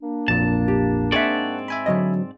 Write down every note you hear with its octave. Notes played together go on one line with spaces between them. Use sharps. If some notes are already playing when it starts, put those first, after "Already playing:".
A#3 D4
A#1 F2 A#2 A5
G4
G#2 C4 G#4 D5 E5 F#5 A5 C#6
E5 G#5 B5
D3 F#3 D#5